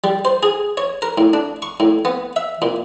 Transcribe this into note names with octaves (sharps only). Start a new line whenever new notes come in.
G3
C5
G#4
C#5
A#4
A2
D4
C#6
A2
B3
E5
A#2